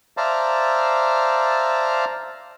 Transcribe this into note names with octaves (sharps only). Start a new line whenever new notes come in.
C5 D5 E5 F5 A5 A#5